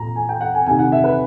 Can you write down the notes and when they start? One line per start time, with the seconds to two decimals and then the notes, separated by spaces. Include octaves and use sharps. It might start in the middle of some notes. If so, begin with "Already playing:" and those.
Already playing: A#2 A#5
0.16 G#5
0.29 G5
0.41 F#5
0.55 G#5
0.66 C3 D#3 G#5
0.79 F#5
0.92 E5
1.04 B4